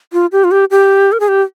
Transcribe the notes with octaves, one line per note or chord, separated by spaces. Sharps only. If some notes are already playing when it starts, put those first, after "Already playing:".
F4
G4
F4
G4
G4
A#4
G#4
G4